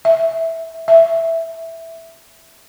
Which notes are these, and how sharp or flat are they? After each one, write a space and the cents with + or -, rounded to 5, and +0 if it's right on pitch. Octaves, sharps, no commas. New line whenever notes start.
E5 -10
E5 +0